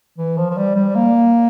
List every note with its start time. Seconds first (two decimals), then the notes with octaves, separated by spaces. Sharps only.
0.18 E3
0.37 F3
0.50 F3
0.57 G3
0.76 G3
0.95 A#3